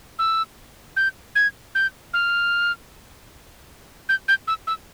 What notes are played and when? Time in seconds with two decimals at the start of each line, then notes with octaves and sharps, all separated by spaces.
0.19 E6
0.97 G6
1.35 G#6
1.75 G6
2.14 F6
4.09 G6
4.28 G6
4.48 E6
4.67 E6